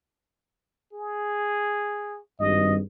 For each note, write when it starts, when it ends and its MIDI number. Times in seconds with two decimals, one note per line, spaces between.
0.93 2.20 68
2.40 2.77 32
2.40 2.77 43
2.40 2.75 75